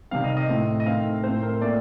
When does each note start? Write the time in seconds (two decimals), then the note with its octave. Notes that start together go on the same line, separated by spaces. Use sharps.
0.11 C3 D#3 G3 C4 F5
0.24 D#5
0.37 D#5
0.49 A2 A3 C4
0.80 D#5
0.86 D#3 A3 C4 F5
1.24 A2 A3 C4 C5
1.43 A#4
1.61 A#2 A3 C4 D5